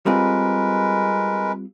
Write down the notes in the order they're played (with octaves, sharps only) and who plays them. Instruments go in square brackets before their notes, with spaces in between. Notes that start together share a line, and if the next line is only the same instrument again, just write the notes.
[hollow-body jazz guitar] G3 C4 F4 [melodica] G#3 A#4 B4